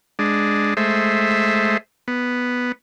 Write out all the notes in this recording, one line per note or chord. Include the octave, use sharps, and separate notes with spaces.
G#3 D4
G#3 A3 C5 E5
B3